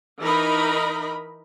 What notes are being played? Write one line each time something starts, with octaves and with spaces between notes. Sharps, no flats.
E3 D#4 A#4 D#5 B5